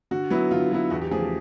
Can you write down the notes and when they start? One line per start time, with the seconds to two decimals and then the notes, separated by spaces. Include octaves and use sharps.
0.11 D3 F#4
0.30 F#3 B3 E4
0.51 D3 F4
0.72 F#3 B3 E4
0.90 E2 F#4
1.01 G4
1.11 C#3 F3 A3 G#4
1.20 G4